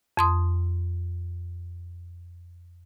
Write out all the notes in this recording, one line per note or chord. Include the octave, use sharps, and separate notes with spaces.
F2 C6 D#6